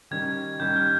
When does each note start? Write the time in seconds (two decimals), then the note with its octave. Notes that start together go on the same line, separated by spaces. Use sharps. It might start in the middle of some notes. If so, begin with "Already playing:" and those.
0.11 D#3 G3 C#4 G#6
0.59 D#3 G3 C#4 G6
0.76 F6